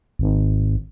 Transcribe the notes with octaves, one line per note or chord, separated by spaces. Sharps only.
G#1